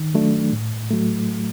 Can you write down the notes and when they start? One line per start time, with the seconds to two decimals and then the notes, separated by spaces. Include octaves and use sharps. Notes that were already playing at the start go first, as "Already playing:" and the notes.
Already playing: D#3
0.14 F#3 A3 D4
0.52 A2
0.91 F#3 A3